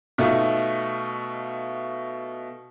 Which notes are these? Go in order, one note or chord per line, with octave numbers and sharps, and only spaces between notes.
B2 A3 D#4 F4